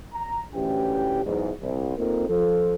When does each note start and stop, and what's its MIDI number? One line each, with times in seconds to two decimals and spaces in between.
0.13 0.41 82
0.54 1.23 33
0.54 1.23 38
0.54 1.23 52
0.54 1.23 61
0.54 1.23 67
0.54 1.23 79
1.25 1.50 35
1.25 1.50 40
1.25 1.50 44
1.62 1.98 36
1.98 2.28 58
1.98 2.28 60
1.98 2.28 63
1.98 2.28 65
1.98 2.28 69
1.98 2.28 70
2.28 2.75 53
2.28 2.75 69